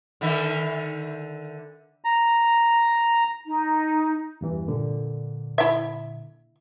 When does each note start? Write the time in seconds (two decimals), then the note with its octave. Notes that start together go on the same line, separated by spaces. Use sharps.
0.21 D3 D#3 E5
2.04 A#5
3.45 D#4
4.41 E2 G2 E3
4.68 A#2 D3
5.58 E4 E5